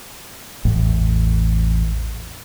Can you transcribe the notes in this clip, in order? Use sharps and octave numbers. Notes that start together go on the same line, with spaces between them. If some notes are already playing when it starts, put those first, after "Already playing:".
A1 E2 A2